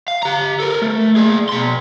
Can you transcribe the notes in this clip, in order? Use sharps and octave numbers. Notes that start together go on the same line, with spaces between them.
F5
G4 A#5
A4 A#4
A3
A#3 G#4
B2 C6